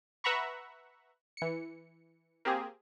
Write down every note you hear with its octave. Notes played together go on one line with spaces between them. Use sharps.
B4 E5 F#5 A#5 B5 C#6
E3 C#7
A#3 C4 G4 G#4